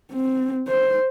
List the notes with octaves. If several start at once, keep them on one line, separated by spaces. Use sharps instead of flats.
C4
C5